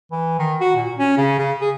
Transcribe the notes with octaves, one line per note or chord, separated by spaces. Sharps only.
E3
D#3
F#4
A#2
C#4
C#3
C#3
G#4